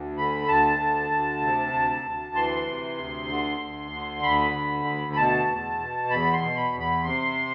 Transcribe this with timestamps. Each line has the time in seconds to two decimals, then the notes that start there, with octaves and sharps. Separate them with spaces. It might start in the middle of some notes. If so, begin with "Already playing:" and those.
Already playing: D2
0.17 D3 B5
0.48 D2 A5
0.80 D3
1.11 D2
1.42 C3
1.73 D2
2.05 D2
2.35 E3 C6
2.66 C3
2.98 D2
3.29 D3
3.61 D2
3.91 D3
4.23 D2 B5
4.54 D3
4.85 D2
5.13 B5
5.16 B2 A5
5.47 E2
5.79 B2
6.10 E2 B5
6.33 C6
6.41 B2
6.57 B5
6.72 E2
6.80 B5
7.04 C3 C6